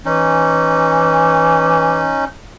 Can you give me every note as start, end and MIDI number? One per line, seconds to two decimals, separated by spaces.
0.05 2.15 52
0.05 2.25 61
0.05 2.25 63